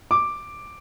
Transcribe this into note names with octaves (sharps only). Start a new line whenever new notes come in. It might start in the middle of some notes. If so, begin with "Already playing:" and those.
D6